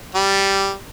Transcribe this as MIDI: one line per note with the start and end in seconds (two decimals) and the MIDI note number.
0.15 0.74 55